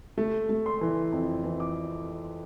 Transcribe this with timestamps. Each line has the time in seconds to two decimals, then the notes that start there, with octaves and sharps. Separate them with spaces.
0.18 A3
0.49 A3
0.66 C6
0.81 E3
1.12 F2
1.44 E3
1.60 D6